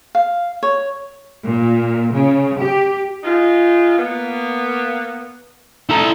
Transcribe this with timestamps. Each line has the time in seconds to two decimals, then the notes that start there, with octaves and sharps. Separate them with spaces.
0.15 F5
0.63 C#5
1.47 A#2
2.15 C#3
2.64 G4
3.24 G#2 D#4 F4
3.98 A#3 B3
5.89 D#3 A3 E4 A4 A#5